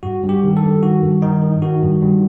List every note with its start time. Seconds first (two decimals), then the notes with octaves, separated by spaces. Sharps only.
0.03 G2 F#4
0.24 G2
0.29 G4
0.43 D#3
0.57 A4
0.62 G2
0.83 D#3 F#4
1.03 G2
1.22 D#3 D#4
1.42 D#3
1.62 D#3 F#4
1.82 G2
2.02 G2